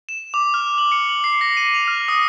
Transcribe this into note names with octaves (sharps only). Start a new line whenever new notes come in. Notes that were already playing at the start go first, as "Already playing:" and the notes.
E7
D6
F6
F#7
C#7
F#7
C7
A#6
D#7
F7
F6
D#6